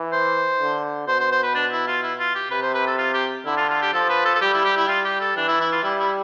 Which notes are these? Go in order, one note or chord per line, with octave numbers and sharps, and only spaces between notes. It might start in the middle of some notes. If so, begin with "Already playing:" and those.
Already playing: E3
C5
D3
B2 C5
C5
C5
B4
D4
E4
F4
E4
F4
G4
C3 B4
C5
B4
A4
F4
G4
D3 E4
F4
F4
G4
F3 A4
B4
A4
A4
G3 G4
E4
G4
E4
G3 F4
G4
A4
E3 D4
E4
E4
F4
G3 E4
E4